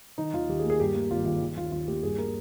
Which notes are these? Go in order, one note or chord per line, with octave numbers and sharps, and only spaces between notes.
D#3 D#4
D#2 F4
D#2 G4
G#4
A#3
G#4
G2 G4
A#3
G#1 F4
D#3 F4
D#3
D#2 F4
D#2 F4
A#3 G4
G2 G#4
A#3 A#4